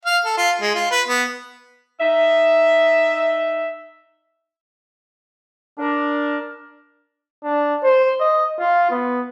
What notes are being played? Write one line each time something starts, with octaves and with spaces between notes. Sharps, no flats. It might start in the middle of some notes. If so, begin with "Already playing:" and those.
F5
A4
F4
G#3
F4
B4
B3
D#4 E5
D4 A#4
D4
C5
D#5
F4
B3